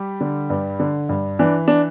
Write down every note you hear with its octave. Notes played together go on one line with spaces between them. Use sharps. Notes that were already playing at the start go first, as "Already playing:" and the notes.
Already playing: G3 G4
D3
G2
D3
G2
E3 D4
D4